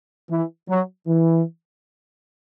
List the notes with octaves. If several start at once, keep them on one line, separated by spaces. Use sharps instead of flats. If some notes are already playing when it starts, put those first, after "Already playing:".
E3
F#3
E3